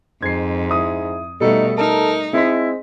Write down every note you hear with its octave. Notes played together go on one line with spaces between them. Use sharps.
F2 G#2 G#6 C7
E4 D#6
B2 G3 A3 D#4 A4
D#4 A4 A#4
G#3 C4 E4 B6